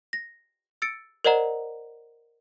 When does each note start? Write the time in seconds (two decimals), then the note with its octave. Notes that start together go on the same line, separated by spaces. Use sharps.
0.13 A#6
0.82 E6 A6 C#7 D7
1.25 A#4 C5 D5 D#5 F#5 A#5